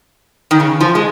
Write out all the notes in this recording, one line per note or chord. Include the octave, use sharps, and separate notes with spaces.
D#3
C#3
F3
G#3